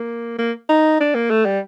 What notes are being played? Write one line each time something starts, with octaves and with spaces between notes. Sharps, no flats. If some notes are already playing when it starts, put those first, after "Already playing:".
Already playing: A#3
A#3
D#4
D4
A#3
A3
G3